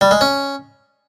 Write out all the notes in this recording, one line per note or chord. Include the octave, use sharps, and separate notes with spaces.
G3
G#3
C#4